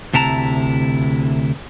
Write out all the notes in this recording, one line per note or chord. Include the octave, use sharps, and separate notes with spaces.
D2 C3 E4 A5 A#5